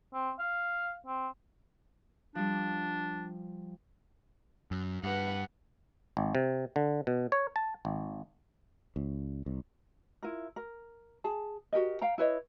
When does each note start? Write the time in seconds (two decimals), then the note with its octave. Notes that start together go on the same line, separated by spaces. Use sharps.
0.14 C4
0.39 F5
1.07 C4
2.35 F3 G3 D4
4.71 F#2
5.04 G2 B4 F#5
6.17 G#1
6.35 C3
6.76 D3
7.07 B2
7.32 C#5
7.56 A5
7.85 G#1
8.96 C#2
9.46 C2
10.23 E4 F4 A#4
10.56 A#4
11.24 G#4 A5
11.73 F#4 G4 A#4 D#5
12.01 F5 G5 A#5
12.18 E4 B4 C#5 D#5